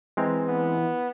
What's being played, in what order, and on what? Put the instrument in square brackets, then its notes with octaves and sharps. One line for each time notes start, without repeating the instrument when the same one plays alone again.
[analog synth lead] E3 [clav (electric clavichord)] G#3 C4 A#5
[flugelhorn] B3